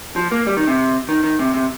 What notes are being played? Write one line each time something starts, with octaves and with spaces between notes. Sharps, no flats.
F3
A#3
G3
D#3
C3
D#3
D#3
C3
C3